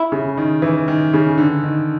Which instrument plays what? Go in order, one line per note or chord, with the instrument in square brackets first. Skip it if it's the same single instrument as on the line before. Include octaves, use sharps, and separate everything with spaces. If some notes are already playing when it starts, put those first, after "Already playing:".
Already playing: [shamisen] E4
[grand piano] C#3
D#3
E3
D#3
C#3
D3
D#3